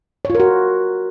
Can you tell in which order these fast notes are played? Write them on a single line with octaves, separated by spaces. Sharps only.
C#5 F4 A#4 F#4